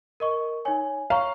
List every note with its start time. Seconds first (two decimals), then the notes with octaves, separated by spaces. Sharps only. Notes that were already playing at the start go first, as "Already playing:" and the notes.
0.20 A#4 D#5 C#6
0.65 D#4 C#5 G#5
1.10 C#5 F5 A#5 C#6